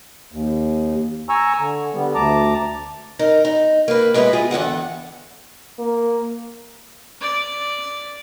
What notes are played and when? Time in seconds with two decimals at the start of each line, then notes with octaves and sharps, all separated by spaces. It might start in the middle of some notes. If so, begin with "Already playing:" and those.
0.32 D#2
1.29 G#5 A#5 C#6 E6
1.59 D3
1.94 D3 G3 B3
2.15 D2 A5 A#5 D6
3.19 D#4 A#4
3.45 D#4
3.88 A#3 B4
4.14 G#3 B3 E4 A4 B4
4.33 G#3 F4 G#4
4.51 E2 D3 D#3 F#5
5.79 A#3
7.21 D5